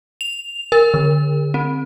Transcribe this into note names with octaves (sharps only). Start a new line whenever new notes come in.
F7
A#4
D3
C4